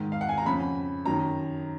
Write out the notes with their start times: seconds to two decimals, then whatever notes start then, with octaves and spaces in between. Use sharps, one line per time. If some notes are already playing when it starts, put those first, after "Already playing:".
Already playing: G#2 D#3
0.12 F5
0.21 F#5
0.29 G#5
0.38 A#5
0.46 F2 C#3 B5
1.06 F#2 D#3 A#5